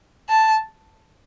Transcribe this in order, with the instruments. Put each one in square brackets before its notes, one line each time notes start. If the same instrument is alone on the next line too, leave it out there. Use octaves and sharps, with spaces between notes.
[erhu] A5